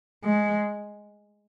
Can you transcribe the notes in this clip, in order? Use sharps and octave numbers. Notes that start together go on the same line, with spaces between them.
G#3